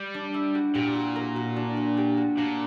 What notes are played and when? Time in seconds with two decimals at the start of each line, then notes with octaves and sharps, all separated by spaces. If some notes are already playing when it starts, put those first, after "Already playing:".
Already playing: G3
0.14 D4
0.34 E4
0.55 F#4
0.75 A#2 G4
0.95 F#4
1.16 A#4
1.36 F#4
1.56 D4
1.77 F#4
1.97 G4
2.17 F#4
2.38 A#2 D4